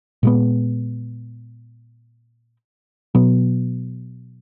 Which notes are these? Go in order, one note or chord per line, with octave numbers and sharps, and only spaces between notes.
A#2 G#3 B3
B2 F#3 B3